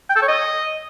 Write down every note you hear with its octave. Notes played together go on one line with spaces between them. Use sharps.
G5
A4
C#5
D#5